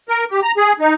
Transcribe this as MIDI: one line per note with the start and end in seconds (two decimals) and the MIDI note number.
0.09 0.25 70
0.31 0.40 67
0.43 0.52 82
0.57 0.73 68
0.80 0.94 63